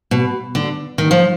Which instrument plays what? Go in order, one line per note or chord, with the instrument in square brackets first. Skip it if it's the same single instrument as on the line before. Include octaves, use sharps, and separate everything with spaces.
[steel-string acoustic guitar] B2
D3
D#3
F3